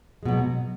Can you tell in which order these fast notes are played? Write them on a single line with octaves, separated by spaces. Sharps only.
G#3 B2 F#3